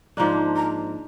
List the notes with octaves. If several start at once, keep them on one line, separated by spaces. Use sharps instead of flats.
G#2 F3 A#3 D4 A#5
A#5